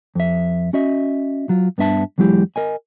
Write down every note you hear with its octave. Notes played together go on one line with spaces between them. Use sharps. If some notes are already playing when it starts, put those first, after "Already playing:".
F2 E5
C#4 F#4 D#5 E5
F#3 F4
G2 B3 D4 E5 A5
E2 F#3 G#3 E4 G4
A#4 D#5 G#5